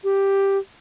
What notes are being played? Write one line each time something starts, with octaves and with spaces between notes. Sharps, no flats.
G4